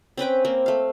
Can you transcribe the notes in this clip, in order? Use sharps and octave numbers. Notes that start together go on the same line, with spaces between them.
C4 C#4 B4 G5
A#3 C4
A3 F5